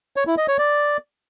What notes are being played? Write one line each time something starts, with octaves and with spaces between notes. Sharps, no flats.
C#5
E4
D#5
C#5
D5